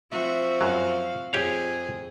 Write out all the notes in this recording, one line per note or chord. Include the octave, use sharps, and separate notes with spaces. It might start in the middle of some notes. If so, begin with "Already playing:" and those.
F3 C4 F#4 E5
F#2 F#3 F5
F2 G4 G#4 C#5 F5